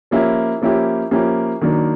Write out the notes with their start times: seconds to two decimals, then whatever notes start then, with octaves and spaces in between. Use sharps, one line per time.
0.11 F3 A#3 C#4 E4 G4
0.62 F3 A#3 C#4 E4 G4
1.11 F3 A#3 C#4 E4 G4
1.61 D#3 F#3 A#3 D4